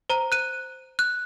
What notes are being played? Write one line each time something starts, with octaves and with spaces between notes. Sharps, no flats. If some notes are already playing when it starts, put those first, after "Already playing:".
C5 A#5
F#6 D#7
F#6